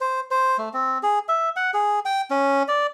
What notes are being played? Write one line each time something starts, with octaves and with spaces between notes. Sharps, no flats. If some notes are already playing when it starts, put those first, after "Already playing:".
C5
C5
A3
C4
G#4
E5
F#5
G#4
G5
C#4
D5